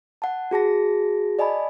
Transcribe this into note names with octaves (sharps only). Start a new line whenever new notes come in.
F#5 A5
F#4 G#4 A5 A#6
D5 D#5 G#5 A5 B5